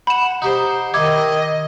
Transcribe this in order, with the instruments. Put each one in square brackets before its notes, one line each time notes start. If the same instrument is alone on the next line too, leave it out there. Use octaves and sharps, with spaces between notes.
[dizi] F#5 [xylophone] B5 E7
[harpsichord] D#4 G4 C5 [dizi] F#5
[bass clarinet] D#3 [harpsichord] E4 [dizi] D#5 [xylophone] D6 G#6